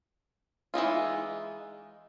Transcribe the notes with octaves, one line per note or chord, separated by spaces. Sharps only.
E3 G#3 D#4 F4